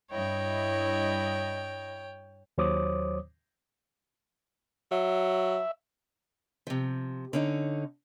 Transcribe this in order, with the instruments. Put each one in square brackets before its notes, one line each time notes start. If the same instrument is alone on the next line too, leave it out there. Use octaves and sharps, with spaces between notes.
[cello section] G2 E4 D#5 [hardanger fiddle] C#5 G5
[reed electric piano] D#2 F#3 C5 C#5 D6 D#6
[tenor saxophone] F#3 [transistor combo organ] E5
[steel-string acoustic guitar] C3 F3
D3 C#4 D#4